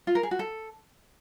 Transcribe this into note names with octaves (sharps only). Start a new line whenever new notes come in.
F4
A#4
G#4
F#4
A4